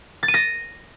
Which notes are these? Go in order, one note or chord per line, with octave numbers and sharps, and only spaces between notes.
A6
D#7
A#6